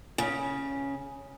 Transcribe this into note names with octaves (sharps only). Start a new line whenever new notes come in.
C#3